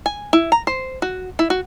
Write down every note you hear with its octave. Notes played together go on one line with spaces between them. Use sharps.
G#5
E4
A#5
C5
F#4
E4
F#4